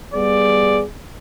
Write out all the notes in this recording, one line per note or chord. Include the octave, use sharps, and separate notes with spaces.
G3 B3 G#4 D5